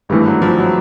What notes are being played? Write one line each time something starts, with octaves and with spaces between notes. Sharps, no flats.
G#1 G2 E3 G3 A3
F#3
F3
F#3